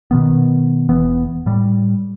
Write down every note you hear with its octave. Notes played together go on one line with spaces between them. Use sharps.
B2 D#3 B3
E1 E3 B3
A2 G3